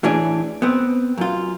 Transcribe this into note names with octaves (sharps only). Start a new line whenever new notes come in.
A2 E3 C#4 D4 G#4
B3 C4
F#2 F4